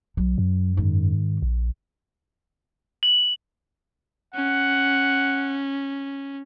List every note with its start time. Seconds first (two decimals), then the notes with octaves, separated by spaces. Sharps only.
0.17 B1 F#3
0.38 F#2
0.77 G#2 D#3
1.42 A#1
3.03 F#7
4.35 C#4 F#5